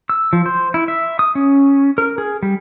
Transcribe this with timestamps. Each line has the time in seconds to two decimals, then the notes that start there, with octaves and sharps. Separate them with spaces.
0.09 E6
0.33 F3
0.46 C5
0.74 E4
0.88 E5
1.19 D#6
1.35 C#4
1.98 A#4
2.18 G#4
2.43 G3